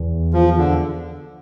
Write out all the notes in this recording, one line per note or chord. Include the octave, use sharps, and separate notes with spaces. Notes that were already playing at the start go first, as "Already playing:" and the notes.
Already playing: E2
F3
D3